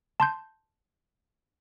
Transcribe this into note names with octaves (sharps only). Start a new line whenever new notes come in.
A5 C6 G6